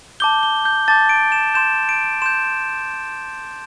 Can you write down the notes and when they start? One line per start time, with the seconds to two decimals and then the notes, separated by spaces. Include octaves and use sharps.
0.20 A5 D6 G6 G7
0.43 G7
0.65 G6
0.88 A5 D6 G6 A6
1.09 D7
1.32 E7
1.55 C6 G6 E7
1.89 D7
2.22 C6 G6 E7